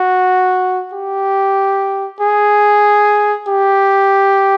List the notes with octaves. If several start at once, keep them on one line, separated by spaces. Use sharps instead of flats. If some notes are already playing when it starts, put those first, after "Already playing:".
Already playing: F#4
G4
G#4
G4